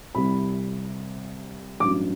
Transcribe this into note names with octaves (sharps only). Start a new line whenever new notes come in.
C2 C3 G3 B5
A1 G2 F#3 D6